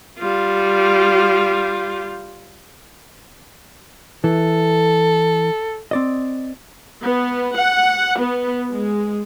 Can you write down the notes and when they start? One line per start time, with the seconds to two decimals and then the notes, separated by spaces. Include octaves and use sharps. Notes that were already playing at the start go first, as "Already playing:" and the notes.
0.18 G3 F4
4.24 E3 A4
5.91 C4 D5 D#5
7.02 B3
7.55 F#5
8.18 B3
8.72 G#3